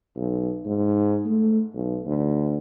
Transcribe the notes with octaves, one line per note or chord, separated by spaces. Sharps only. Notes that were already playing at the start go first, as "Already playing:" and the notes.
B1
G#2
A3
B1
D2